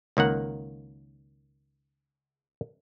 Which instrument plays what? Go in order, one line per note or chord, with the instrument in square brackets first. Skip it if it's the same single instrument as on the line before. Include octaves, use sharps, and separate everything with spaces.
[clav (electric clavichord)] C#2 D#3 A#3 F#5